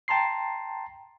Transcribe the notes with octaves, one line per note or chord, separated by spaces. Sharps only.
G5 A5 A#5 C6 C7